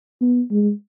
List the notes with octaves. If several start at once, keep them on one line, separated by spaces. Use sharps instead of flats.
B3
G#3